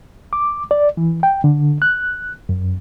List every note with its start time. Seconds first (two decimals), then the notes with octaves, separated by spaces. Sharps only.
0.33 D6
0.71 D5
0.97 E3
1.23 G5
1.44 D3
1.82 F#6
2.49 F#2